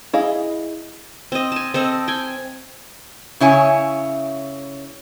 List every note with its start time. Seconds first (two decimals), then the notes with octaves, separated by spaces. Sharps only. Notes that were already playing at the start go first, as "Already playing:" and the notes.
0.13 E4 G#4 D#5 F5
1.32 C4 D#5
1.52 G#5 A5
1.74 C4 A4 D#5
2.08 G5 G#5
3.40 C#3 E4 C#5 G#5